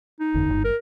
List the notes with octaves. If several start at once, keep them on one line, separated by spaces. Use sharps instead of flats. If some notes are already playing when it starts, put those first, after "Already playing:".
D#4
F#1 E2 D3
G1 G#2
A#4